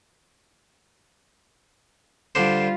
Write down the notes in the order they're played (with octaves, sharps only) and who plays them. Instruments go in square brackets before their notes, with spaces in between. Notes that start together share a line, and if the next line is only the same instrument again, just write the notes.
[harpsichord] D3 D4 C5 [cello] G3 F4